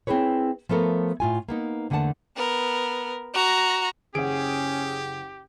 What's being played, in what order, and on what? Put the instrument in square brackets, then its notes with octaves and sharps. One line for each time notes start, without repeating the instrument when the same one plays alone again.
[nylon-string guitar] C4 E4 G#4 B4 C#5
F3 A3 B3 A4 A#4
A2 F4 G#5
A#3 B3 D#4
E2 D3 A3 A#3 F#5 A5
[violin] B3 A#4
F#4 A#5
[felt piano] F#1 F#5 [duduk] C#4 [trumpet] G4 [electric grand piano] G#4 D7